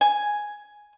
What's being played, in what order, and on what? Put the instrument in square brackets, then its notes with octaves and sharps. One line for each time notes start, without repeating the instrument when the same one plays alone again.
[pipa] G#5